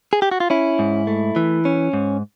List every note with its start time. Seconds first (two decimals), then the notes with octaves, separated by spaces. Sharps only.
0.13 G#4
0.22 G4
0.31 F#4
0.40 F4
0.50 C#4 E4
0.79 G#2
1.07 A3
1.36 E3
1.65 C#4
1.93 G#2